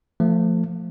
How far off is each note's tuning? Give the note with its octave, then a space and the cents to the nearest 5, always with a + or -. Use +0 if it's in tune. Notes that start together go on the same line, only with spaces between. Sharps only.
F3 +0 A3 +25